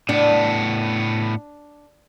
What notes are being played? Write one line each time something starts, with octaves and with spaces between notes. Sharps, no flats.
A2 B3 D4